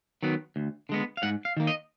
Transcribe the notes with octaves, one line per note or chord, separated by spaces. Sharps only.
D#3 F#3 B3
D2
D3 G#3 B3
F5
G#2 F#5
F5
D#3 A#3
D#5